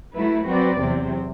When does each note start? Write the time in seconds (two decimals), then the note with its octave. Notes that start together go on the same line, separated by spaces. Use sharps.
0.15 F#3 A3 E4 B4
0.47 F#3 C4 F#4 B4 D5
0.79 E2 C3 F#3 C4